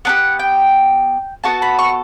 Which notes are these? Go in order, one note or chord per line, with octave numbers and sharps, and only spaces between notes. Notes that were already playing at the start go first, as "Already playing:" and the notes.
B3 D4 G4 F#5
G5
B3 F#4 A4 A5
B5
C#6